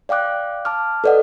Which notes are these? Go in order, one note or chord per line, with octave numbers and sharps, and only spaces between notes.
D5 F5 G5 D6 F#6
A5 D6 F6
A4 B4 D5 D#5 F#5